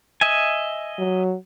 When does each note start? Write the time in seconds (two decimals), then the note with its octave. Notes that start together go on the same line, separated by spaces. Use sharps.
0.21 D#5 E5 G#5
0.99 F#3